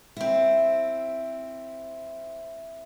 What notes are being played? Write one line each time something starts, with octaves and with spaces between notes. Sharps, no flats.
C4 E4